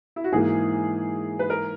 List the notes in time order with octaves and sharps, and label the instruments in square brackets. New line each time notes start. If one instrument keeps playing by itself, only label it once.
[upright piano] E4
F#4
[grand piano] G#2 E3 A#3 [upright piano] G#4
[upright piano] B4
A#4